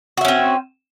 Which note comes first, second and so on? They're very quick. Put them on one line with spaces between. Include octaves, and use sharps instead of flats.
F#4 E5 C#4 C4